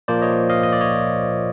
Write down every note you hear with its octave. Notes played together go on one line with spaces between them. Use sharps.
A#2 F3 A#3 C5 D5
C#5 D#5
D#5 F5
D#5
D5
C#5 D#5